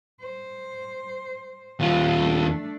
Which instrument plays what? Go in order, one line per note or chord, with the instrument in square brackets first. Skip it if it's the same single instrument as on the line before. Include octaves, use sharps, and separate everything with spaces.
[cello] C5
[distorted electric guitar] D#2 F4
[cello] A3 D4